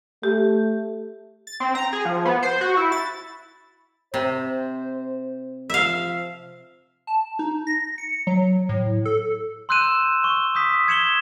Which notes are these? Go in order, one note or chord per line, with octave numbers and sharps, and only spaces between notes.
A3 G4
A6
C4
A#5
G#4
F3
B3
C5
F#4
E4
A6
C3 C5
F3 E5 F5
A5
D#4
A#6
C#7
F#3
A2
A4
C6 E6 F#6 G6 D#7 E7
C#6
D#6 G6 B6
G#6 C#7 E7 F#7 G7